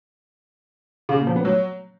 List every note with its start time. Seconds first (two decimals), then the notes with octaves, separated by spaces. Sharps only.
1.09 C#3
1.18 A#2
1.27 F3
1.36 B3
1.45 F#3